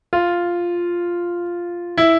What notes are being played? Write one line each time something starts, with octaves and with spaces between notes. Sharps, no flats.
F4
E4